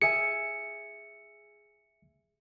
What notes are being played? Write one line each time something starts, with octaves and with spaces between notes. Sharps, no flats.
G#4 E5 G#5 C#7